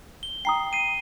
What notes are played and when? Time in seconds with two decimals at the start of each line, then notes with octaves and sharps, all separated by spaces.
0.23 G7
0.45 G5 A#5 D#6 C7
0.73 C7 D#7